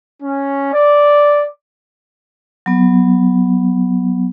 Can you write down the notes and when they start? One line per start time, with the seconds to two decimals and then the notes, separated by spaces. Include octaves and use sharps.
0.22 C#4
0.73 D5
2.66 F#3 B3